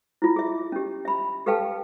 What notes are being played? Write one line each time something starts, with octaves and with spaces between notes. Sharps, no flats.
E4 F4
G#4 E5
C#4 G4
E5 B5
G4 A4 B4 F5 G5 A5